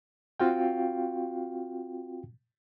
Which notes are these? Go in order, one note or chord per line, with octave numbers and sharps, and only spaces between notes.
C4 F4 F#4 F5 G5